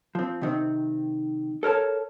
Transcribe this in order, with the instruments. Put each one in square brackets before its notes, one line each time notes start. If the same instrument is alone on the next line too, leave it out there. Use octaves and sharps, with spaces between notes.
[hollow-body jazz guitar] F3 C4
C3 D#3 C4
A4 A#4 C#5 A5